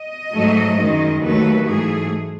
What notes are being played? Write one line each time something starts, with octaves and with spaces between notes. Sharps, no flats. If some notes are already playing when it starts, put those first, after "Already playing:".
Already playing: D#5
G#2 F#3 A3
F#2 D#3 G#3
D#2 D#3 F#3 A3 B4
G#2 E3 A3 G#4